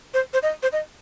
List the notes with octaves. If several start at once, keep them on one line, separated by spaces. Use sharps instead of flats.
C5
C5
D#5
C5
D#5